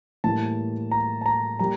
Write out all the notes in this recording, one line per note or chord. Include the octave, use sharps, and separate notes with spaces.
A2 E3 G3 A#3 A5
A#5
A5
A#5
G3 A#3 A#5